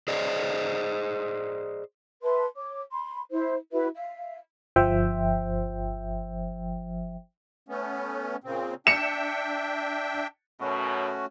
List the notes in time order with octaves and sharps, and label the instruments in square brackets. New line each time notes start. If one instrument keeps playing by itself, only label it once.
[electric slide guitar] G#4 C5 D5 D#5
[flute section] B4 E5 A5 C6
C#5 D6
B5 C6
E4 C5
E4 F#4 B4 E5
E5 F5
[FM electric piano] G1 F3 C5 E5 G5
[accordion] A3 B3 C#4
A#2 C#3 C4
[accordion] D4 E5 G5 [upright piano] C#7 E7
[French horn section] F#2 B2 [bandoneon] A3 C#4 F#4